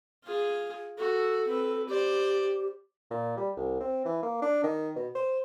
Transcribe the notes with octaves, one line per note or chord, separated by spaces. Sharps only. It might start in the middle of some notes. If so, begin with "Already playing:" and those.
F4 G#4
F#4 A4
C4 B4
G4 C5 D5
A#2
G3
C2
C4
E3
A#3
D4
D#3
B2
C5